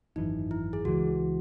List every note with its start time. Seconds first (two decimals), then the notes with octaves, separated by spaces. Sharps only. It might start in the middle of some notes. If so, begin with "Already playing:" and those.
0.16 G#1 F#2 E3 D#4
0.51 E4
0.73 G#4
0.85 C#2 C#3 E3 G#3 F#4